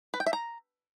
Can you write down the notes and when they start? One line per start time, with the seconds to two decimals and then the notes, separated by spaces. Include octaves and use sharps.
0.14 B4
0.20 G5
0.26 E5
0.33 A#5